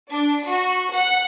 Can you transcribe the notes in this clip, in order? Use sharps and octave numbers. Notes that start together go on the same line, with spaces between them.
D4
F#4
F#5